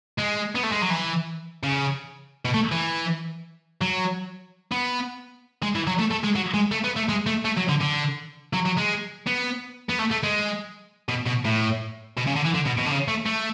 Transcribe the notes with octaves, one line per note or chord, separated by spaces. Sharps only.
G#3
B3
A3
G#3
F#3
E3
C#3
B2
A3
E3
F#3
B3
G#3
E3
F#3
A3
A3
G#3
F#3
G#3
A3
B3
A3
G#3
A3
A3
F#3
D3
D3
F#3
F#3
G#3
B3
B3
A3
A3
G#3
B2
B2
A2
B2
C#3
D3
E3
D3
B2
B2
D3
C#3
A3
A3